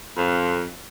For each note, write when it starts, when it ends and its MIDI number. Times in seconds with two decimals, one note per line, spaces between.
0.17 0.69 41